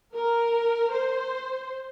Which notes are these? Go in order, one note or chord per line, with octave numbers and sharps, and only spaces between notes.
A#4
C5